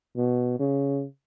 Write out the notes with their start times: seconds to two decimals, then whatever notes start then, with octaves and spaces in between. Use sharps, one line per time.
0.16 B2
0.59 C#3